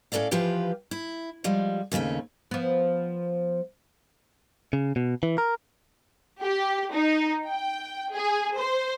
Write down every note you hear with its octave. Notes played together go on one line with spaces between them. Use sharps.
A2 C#4 A4 D5 F5
E3 F3 F4 G4 B4
E4
F3 G3 G#3
D#2 C#3 A3 C4 C#4
F3 B3
C#3
B2
E3
A#4
G4
D#4
G5
G#4
C5